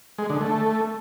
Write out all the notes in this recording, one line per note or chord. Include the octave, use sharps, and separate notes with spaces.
G#3
D3
A3